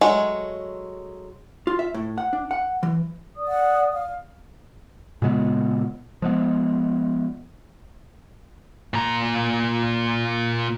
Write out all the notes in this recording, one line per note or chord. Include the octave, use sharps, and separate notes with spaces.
F#3 G#3 A3
F4
E5
A2
F#5
D4
F#5
E3
D5 D#6
F#5
F5
A#2 C#3 G#3 B3
F3 G#3 B3
A#2 A#5